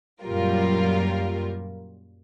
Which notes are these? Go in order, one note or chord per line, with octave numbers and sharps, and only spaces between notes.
F#2 A#2 F#3 G3 F4 A#4